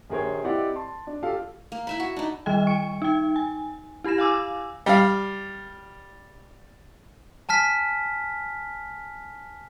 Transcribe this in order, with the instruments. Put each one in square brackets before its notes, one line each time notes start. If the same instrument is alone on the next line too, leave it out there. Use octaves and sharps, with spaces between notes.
[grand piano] A#1 D#2 G#4 A#4 C5 C#5
C4 E4 G4 D5 D#5 F#5
A5 C6
D4
F4 G4 A4 F5
[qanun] A#3
E4 E5 B5
F#4
D4 D#4
[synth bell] D#3 G3 D#5 G5
C#6 C#7
D#4 G5
G#5
E4 G4 B5 A#6 E7
F5 G#5 D6 E6
[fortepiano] G3 F5
[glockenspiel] G#5 A5 F6 B6